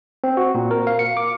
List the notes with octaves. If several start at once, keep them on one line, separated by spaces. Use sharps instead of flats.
C4
F#4
A#2
A#4
F5
C#7
D6